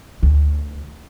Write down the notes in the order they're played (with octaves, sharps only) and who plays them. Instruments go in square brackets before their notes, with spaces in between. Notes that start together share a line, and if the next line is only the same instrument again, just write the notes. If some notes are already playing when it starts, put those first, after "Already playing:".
[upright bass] D2